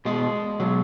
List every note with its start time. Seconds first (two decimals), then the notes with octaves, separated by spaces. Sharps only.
0.05 B2 G#3
0.59 B2 F#3